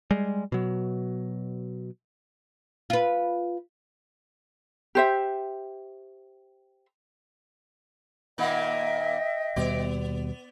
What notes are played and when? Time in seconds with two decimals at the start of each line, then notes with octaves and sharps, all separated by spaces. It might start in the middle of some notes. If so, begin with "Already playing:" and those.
0.11 G3 G#3
0.52 B2 F#3
2.90 F4 B4
4.95 G4 C5 E5
8.38 A#2 D#3 A#3 D#5 E5 G5
9.56 D#2 B2 G3 B3 D5